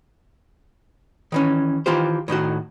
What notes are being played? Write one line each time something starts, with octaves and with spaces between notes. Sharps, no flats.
D#3 E3 C#4
D#3 E3 F4 G4 C5
A2 D#3 D#4 F#4